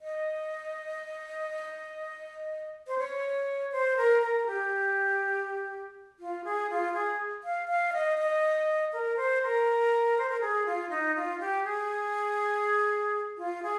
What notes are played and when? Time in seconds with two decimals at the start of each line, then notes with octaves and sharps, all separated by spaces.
0.01 D#5
2.87 C5
2.98 C#5
3.72 C5
3.97 A#4
4.22 A#4
4.47 G4
6.19 F4
6.44 G#4
6.70 F4
6.94 G#4
7.44 F5
7.68 F5
7.93 D#5
8.18 D#5
8.93 A#4
9.17 C5
9.42 A#4
10.18 C5
10.29 A#4
10.41 G#4
10.66 F4
10.90 D#4
11.16 F4
11.40 G4
11.64 G#4
13.38 F4
13.63 G#4